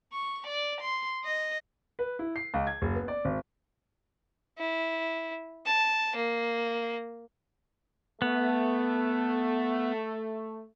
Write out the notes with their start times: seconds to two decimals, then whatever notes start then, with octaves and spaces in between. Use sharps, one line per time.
0.13 C#6
0.47 D5
0.81 C6
1.25 D#5
1.99 B4
2.19 E4
2.36 C7
2.54 C#2
2.67 G#6
2.82 F#1
2.96 B3
3.08 D5
3.25 G#1
4.58 E4
5.66 A5
6.16 A#3
8.22 A3 B3